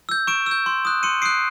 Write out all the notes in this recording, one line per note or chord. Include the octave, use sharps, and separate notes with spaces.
E6 G6
C#6 D7 E7
E6 G6
C6
D#6 F#6
C6 C#7 D#7
D#6 F#6 C7 D7